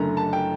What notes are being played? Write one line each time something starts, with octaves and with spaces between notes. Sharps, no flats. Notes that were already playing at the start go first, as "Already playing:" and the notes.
Already playing: F#1 F#2 D3 A3 A#5
A5
G5